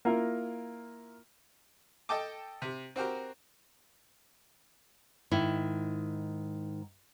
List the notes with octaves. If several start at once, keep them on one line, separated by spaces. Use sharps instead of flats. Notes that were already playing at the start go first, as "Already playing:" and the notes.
A#3 E4 F4 A#4
A4 D#5 G5 A5 D6
C3
C4 F#4 G4 A#4
G#2 D#3 E4